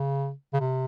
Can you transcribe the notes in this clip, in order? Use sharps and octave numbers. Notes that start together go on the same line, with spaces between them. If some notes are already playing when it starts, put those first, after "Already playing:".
Already playing: C#3
C#3
C3